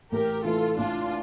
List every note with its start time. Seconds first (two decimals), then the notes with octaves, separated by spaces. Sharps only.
0.12 A1 G4 A#4
0.45 A2 E3 F4 A4
0.78 A1 D4 F4